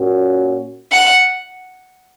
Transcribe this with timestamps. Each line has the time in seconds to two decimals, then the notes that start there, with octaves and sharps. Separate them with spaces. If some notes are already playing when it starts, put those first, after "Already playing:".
Already playing: A#2 A#3 C#4 F#4
0.92 F#5